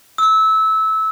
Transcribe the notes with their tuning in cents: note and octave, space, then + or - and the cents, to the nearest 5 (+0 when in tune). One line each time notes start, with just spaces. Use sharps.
E6 -20